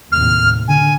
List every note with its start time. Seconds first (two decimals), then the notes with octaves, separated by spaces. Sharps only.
0.12 D#2 A2 C3 F6
0.68 D3 G#5